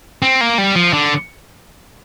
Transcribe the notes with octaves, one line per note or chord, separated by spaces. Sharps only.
C4
A#3
G3
F3
D3